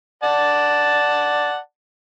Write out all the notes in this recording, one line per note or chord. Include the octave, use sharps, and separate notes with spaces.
D5 F#5 A5